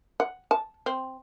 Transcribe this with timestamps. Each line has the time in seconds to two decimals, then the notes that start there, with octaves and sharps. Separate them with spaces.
0.20 F#5
0.51 A5
0.86 C4